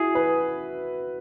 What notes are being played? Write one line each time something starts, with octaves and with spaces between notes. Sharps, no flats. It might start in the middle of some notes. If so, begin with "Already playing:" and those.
Already playing: E4 F#4 G#4
B4